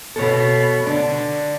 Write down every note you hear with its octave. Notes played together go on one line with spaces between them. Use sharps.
B2 A4 C#5
D3 D4